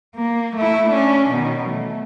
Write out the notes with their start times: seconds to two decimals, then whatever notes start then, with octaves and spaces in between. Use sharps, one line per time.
0.16 A#3
0.56 A3 E4
0.89 C#4 D4
1.30 B2 D#3
1.69 A3